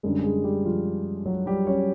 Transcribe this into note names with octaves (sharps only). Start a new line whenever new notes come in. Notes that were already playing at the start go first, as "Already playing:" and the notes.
F#2 D3 G3 G#3 G#4
G#3 G#4
G3 G4
F3 F4
F#3 F#4
G3 G4
C#4 C#5